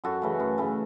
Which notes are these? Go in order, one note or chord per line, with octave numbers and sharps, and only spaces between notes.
F#2 F#4 A4
C#3 E3 A3
F#2
C#3 E3 A3